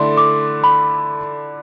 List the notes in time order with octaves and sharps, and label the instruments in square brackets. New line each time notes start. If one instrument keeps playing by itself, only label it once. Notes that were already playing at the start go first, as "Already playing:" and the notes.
Already playing: [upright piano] D3 A3 E4 D5 [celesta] C6
[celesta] D6
B5